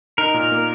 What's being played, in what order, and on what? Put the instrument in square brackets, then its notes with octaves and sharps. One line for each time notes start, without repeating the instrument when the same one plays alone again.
[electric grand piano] D#4 [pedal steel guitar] A#4
[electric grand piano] A#2
A#3